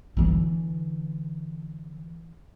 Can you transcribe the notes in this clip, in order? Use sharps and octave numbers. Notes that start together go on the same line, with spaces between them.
D3 E3